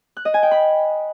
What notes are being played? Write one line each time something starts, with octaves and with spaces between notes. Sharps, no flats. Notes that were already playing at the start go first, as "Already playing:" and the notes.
F#6
D#5
G#5
G5
B5